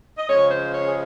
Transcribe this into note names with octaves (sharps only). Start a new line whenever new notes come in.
D#5
C#3 F3 G#3 C#5
C5
C#5
G#4